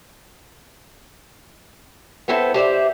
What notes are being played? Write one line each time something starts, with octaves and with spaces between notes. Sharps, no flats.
B3 C4 E4 A4 C5 A5
G4 C5 D5 E5